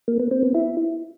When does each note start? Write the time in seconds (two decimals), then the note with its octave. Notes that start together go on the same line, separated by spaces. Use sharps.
0.08 A#3
0.20 B3
0.31 C4
0.43 B3
0.55 E4